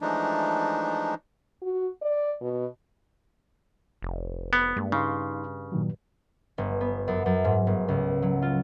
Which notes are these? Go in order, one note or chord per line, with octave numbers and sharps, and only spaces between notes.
E3 F3 G#3 A3 D4 D#4
F#4
D5
B2
F1
B3
G2 G#3 A#3
C#3 D#4 F5 C6
A#2 D#3 F#3
G1
B3
F#2
F#2
G#2
G1
C#2
F#3
F4